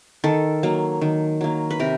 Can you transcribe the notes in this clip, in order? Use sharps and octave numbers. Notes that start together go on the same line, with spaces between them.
D#3 A4
F#3 A#3
D#3
F#3 A#3
B4
C3 A#4